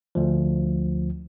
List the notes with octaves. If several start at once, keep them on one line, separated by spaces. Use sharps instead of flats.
D2 F3